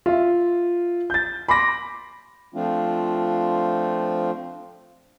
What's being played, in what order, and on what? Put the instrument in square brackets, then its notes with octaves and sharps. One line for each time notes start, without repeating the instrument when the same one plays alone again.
[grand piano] F4 E5
G6 A6
B5 C6 D6 A#6
[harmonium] F3 A3 C4 D4 F4